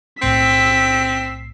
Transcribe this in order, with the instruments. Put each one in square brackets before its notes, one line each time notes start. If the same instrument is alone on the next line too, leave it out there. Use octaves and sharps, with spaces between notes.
[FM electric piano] B1 A2 C7 [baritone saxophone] C4 [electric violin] E6 B6